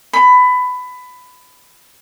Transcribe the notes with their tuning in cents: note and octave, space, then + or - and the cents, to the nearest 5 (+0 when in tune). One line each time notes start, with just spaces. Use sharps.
B5 +20